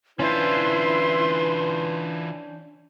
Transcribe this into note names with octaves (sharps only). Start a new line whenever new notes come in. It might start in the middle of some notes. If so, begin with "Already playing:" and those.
E3 C#4 D4 E4 F4 B4 C5 C6